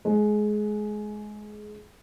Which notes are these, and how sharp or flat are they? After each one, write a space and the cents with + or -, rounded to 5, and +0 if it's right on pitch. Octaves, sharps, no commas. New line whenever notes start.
G#3 +20